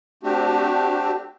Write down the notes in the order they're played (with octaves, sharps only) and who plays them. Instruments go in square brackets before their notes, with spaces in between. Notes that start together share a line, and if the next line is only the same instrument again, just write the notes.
[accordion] A3 C4 D4 F#4 G4